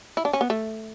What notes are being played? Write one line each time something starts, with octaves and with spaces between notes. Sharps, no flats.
E4
D4
C#4
B3
A3